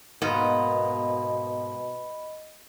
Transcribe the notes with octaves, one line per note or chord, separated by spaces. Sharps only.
G#2 B2 A#3 B3 D#5 B5